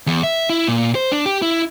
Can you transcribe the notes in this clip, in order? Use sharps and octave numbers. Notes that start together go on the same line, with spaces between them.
E2
E5
E4
A#2
C5
D4
G4
E4